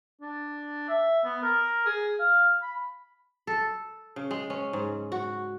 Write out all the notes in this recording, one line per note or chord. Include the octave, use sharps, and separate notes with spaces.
D4
E5
B3
A#4
G#4
F5
B5
A4
C#3
G#3
C#4
G#2
F#4